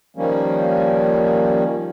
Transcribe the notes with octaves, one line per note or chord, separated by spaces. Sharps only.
D#3 F3 G3 A#3 C#4